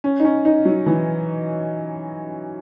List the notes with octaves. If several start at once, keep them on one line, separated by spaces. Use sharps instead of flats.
C#4
D#4
C#4
D#4
F#3
E3